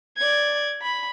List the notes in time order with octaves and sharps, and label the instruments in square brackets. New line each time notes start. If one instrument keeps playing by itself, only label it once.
[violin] D5 G#6
B5